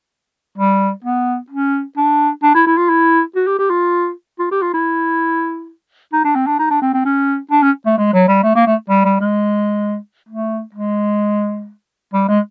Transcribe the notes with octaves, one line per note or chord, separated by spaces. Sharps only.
G3
B3
C#4
D4
D4
E4
E4
F4
E4
F#4
G4
G4
F4
F4
G4
F4
E4
D#4
D4
C4
D4
D#4
D4
C4
C4
C#4
D4
C#4
A3
G#3
F#3
G3
A3
A#3
A3
G3
G3
G#3
A3
G#3
G3
G#3